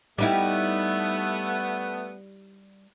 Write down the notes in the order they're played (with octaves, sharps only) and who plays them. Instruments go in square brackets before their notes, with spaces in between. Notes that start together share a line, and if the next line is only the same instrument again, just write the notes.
[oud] G3 D#4 E4 [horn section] A3 B3